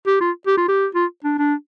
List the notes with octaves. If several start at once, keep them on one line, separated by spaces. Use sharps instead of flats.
G4
F4
G4
F4
G4
F4
D4
D4